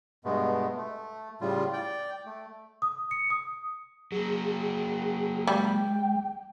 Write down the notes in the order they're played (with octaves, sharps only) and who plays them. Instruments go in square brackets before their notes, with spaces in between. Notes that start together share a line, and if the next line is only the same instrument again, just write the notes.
[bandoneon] G2 B2 G#3 A3 B3
A3
A2 C#3 G3 F4
D5 G5
A3
[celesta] D#6
C#7
D#6
[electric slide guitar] F#3 A#3 [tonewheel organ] G#4
[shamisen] G3 [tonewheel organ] G#3 [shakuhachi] G5